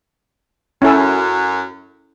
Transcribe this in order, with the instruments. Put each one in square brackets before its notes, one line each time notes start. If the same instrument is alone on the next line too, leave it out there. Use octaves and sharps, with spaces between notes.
[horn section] F#2 [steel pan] C#4 E4 A4